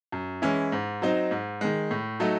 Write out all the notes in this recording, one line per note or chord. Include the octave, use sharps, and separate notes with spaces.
F#2
E3 G#3 C#4 E4
G#2
F#3 C4 D#4
G#2
D#3 G#3
A2
F#3 A3 D#4